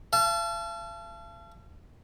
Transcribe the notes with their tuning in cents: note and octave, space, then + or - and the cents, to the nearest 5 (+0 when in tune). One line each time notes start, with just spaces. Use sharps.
F5 -45 A5 -20